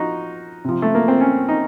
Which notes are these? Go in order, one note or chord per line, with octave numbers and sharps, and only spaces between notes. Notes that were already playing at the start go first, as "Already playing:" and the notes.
Already playing: F3 D#4 F#4
C3 F3
A3
A#3
C4
C#4
D#4